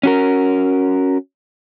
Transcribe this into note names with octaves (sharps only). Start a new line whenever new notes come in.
C#4 F#4 A#4